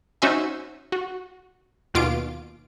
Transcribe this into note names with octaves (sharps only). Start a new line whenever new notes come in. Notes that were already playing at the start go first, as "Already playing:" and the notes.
C#4 D#4 F#4 C5 E5 G#5
F#4
D#2 B2 F4 D6 D7